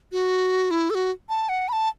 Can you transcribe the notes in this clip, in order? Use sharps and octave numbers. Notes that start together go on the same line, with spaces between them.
F#4
E4
A4
F#4
A5
F#5
B5
A5